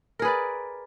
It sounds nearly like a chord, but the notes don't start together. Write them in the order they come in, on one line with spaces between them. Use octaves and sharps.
A#4 G#4 B4 D5